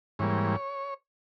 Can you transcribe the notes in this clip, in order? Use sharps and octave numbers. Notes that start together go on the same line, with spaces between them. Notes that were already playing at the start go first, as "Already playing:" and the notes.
G#2 E3 G3 A#3 C#5